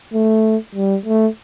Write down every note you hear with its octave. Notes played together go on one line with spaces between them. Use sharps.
A3
G3
A3